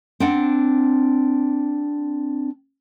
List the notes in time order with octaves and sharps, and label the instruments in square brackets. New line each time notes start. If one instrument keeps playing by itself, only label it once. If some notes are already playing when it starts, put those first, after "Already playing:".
[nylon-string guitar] C4 D4 F#5